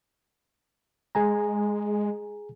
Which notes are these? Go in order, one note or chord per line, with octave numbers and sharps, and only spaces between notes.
G#3 G#4 G#5 A#5